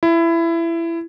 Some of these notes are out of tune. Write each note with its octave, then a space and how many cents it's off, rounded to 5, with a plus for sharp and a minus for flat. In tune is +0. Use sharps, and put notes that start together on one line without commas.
E4 +20